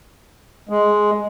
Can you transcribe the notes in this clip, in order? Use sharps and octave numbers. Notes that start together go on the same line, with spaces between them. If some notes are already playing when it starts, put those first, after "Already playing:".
G#3